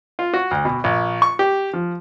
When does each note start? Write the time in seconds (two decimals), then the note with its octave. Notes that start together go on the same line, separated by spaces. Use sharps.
0.19 F4
0.34 F#4
0.51 D2
0.65 B2
0.84 A#1
1.22 C#6
1.39 G4
1.73 F3